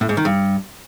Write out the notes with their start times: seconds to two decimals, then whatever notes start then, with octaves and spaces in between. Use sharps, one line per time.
0.01 A2
0.09 G#2
0.17 D#3
0.25 G2